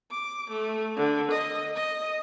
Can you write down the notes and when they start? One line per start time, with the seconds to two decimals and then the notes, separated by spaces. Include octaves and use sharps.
0.11 D6
0.50 A3
0.96 D3
1.31 D#5
1.75 D#5